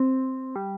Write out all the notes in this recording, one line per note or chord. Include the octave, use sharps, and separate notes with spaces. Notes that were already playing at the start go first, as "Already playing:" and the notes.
Already playing: C4
G3